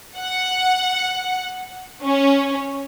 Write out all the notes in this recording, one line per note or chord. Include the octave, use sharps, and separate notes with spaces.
F#5
C#4